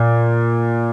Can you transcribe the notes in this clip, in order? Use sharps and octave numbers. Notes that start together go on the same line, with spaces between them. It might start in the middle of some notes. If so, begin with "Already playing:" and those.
Already playing: A#2